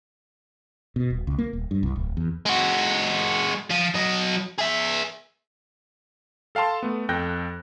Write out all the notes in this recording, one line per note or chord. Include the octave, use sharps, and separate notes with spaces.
B2
D#1
C#2
A#3
D#1
G2
C2
D1
E2
G#3 F#4
F3
F#3 D#5
G#4 E5
A4 F5 G5 A5 C6
A3 B3
F2 A4 G5 F#6 G6 A#6